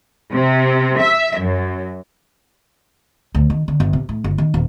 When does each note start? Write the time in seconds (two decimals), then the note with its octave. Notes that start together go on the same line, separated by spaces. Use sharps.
0.33 C3
0.99 E5
1.40 F#2
3.35 D2
3.50 D#3
3.68 D3
3.80 G1
3.93 C3
4.09 A2
4.24 G1
4.38 D#3
4.54 D#1